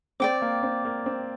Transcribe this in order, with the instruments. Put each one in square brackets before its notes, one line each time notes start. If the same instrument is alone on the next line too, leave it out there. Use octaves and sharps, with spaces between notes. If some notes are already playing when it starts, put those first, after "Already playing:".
[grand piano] C4 [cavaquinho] D5 G5 D6
[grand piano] A#3
C4
A#3
C4